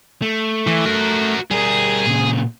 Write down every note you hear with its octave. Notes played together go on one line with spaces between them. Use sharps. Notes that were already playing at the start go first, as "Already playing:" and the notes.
A3
E3
F#4 A#4
G3 G#4 A#4
A#2 C#3